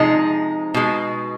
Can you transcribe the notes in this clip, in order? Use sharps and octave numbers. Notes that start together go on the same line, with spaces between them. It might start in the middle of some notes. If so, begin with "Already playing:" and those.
Already playing: C3 F3 G#3 D#4
B2 G#3